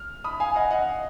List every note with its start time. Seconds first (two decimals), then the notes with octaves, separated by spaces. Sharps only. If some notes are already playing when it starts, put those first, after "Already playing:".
Already playing: F6
0.24 B5 D#6
0.40 F5 G#5
0.56 D#5 F#5
0.71 D#5 F#5